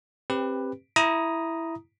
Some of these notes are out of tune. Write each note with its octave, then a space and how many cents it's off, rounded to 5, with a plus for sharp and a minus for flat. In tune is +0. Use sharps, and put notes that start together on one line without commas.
C4 +25 G4 +15 B4 +5
E4 +0 A#5 +10 D#6 +0